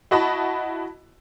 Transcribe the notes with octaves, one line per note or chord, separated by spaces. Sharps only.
E4 F#4 D#5 A5 B5